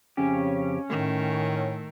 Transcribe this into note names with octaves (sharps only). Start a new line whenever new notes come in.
F2 C#3 C#4 G4
A2 D#3 A3